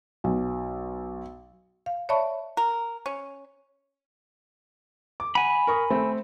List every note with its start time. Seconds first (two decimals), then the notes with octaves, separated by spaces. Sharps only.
0.24 B1
1.86 F5
2.09 C#5 D5 E5 A5 B5 C#6
2.57 A#4
3.06 C#4
5.20 D6
5.35 F#5 G#5 B5
5.67 A#4 C#6 D#6
5.90 A3 C4